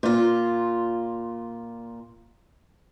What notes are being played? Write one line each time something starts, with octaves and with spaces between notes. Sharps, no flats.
A#2 F4